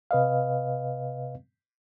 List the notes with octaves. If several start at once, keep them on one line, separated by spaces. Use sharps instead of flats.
C3 B4 D#5 F5